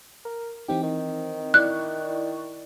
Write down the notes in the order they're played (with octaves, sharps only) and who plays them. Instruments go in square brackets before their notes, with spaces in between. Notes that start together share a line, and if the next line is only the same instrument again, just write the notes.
[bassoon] A#4
[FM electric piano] E3 C4 D#4 [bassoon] G4
[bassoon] D#3
[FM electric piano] E4 D5 C#6 [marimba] F#6